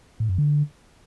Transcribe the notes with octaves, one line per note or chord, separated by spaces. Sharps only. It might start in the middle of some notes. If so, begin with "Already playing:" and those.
A2
F#2
D3